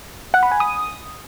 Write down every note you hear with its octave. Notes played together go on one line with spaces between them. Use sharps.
F#5
B5
G#5
D#6